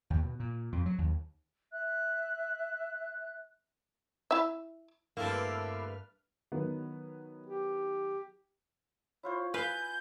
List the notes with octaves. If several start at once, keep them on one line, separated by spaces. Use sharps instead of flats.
D#2
B2
A#2
F2
F#3
D#2
E5 F#6
E4 E5
G2 D3 A3 A#3 C4 E4 B4 F6
D#3 F#3 B3
G4
E4 F4 C5 C#5
B4 F5 G#5 G6